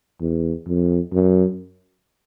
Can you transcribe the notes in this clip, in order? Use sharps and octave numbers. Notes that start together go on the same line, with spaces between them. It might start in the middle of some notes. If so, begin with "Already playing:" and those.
E2
F2
F#2